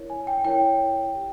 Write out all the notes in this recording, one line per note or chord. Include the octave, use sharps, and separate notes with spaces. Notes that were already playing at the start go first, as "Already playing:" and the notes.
Already playing: E4 A#4 C#5
G#5
G5
E4 A#4 C#5 G5
G4